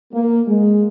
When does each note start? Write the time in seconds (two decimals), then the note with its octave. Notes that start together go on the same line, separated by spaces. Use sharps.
0.13 A#3
0.48 G#3